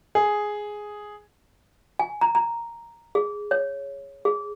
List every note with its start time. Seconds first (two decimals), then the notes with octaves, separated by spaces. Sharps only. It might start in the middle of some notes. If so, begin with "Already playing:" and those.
0.15 G#4
1.99 G#5
2.21 A#5
2.35 A#5
3.15 G#4
3.51 C#5
4.25 G#4